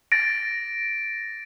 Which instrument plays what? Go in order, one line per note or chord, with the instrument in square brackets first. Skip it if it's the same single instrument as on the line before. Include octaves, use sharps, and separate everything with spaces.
[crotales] A6 A#6 D7